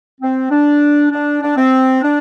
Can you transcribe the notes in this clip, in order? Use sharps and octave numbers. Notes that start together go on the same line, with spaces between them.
C4
D4
D4
D4
C4
D4